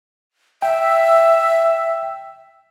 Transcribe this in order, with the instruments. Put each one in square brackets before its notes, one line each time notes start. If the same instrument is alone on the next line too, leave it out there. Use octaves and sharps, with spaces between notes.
[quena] E5 [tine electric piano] G5